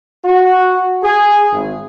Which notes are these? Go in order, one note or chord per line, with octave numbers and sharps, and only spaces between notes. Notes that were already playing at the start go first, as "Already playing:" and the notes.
F#4
G#4
G#1